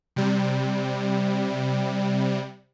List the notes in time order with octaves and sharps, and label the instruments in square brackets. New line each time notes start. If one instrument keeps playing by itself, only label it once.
[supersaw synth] C3 G3